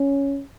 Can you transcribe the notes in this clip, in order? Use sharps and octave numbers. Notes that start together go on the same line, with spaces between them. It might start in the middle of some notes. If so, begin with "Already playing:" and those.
Already playing: C#4